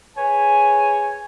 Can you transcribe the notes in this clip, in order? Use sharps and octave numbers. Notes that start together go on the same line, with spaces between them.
G#4 B4 C#5 G#5